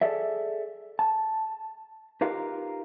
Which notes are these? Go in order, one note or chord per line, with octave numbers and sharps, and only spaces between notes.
G#4 A4 D5 E5
A5
D#4 F4 G4 A#4 B4 F5